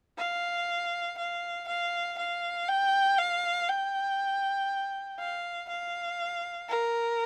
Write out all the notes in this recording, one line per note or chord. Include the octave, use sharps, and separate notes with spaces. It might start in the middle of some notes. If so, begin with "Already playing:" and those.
F5
F5
F5
F5
G5
F5
G5
F5
F5
A#4